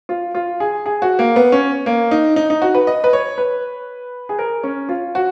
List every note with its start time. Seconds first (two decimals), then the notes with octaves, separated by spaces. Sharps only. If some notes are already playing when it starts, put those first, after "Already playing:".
0.09 F4
0.35 F4
0.60 G#4
0.86 G#4
1.02 F#4
1.19 A#3
1.36 B3
1.52 C#4
1.86 A#3
2.11 D#4
2.36 D#4
2.50 D#4
2.62 F#4
2.75 B4
2.87 D#5
3.04 B4
3.13 C#5
3.38 B4
4.29 G#4
4.39 A#4
4.63 C#4
4.89 F4
5.15 F#4